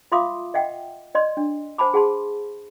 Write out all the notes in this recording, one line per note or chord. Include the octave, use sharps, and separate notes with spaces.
F4 E5 F5 C6 D6 D#6
D#5 E5 F#5 G5
D5 D#5 C6
D4
C5 F#5 G#5 A5 B5 D6
G#4 F#5 A5 C6